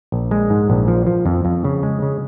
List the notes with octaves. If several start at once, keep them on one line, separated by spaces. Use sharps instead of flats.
A#1
G#3
G#2
A#1
F3
F3
F2
F2
C#3
G#3
C#3